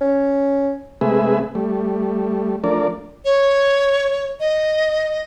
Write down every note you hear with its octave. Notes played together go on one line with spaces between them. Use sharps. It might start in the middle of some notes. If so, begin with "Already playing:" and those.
C#4
C3 G#3 A3 G#4 B4 E5
G3 A3
F3 A3 D4 A#4 D5
C#5
D#5